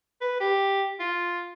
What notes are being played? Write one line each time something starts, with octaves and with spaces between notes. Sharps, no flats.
B4
G4
F4